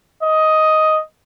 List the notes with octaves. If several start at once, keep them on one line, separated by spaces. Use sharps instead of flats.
D#5